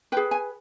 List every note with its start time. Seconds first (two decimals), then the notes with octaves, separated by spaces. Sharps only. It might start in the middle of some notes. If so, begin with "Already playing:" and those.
0.12 B4 G5
0.17 G#4
0.31 G#5